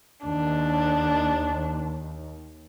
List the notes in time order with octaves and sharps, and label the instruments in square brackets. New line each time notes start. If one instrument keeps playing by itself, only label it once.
[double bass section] D#2 [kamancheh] D4